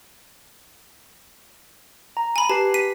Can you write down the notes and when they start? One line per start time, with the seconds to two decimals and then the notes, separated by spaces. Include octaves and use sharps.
2.17 A#5
2.36 G#5 B5
2.49 G4 B4 A5 C7
2.74 B6 D#7